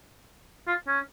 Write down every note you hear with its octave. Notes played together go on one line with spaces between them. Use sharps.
F4
C#4